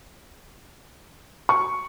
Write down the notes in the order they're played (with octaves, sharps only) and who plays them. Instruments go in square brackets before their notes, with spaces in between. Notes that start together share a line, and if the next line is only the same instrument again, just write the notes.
[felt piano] C#6